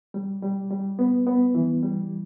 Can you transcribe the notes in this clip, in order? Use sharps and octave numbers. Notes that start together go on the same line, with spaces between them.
G3
G3
G3
B3
B3
E3
G3